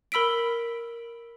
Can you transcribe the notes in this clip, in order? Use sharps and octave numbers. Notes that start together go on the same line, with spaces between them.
A#4 B5 E6 B6 D7